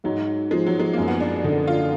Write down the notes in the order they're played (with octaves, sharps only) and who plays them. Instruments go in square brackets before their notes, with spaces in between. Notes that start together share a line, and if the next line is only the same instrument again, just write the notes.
[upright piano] G#2 [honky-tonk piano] F#3
[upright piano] F3 [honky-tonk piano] G#3
[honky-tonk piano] F#3
G#3
[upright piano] F#2 [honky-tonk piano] A#3
[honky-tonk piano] B3
D4
[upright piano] D3 [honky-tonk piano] D#4
[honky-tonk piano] F4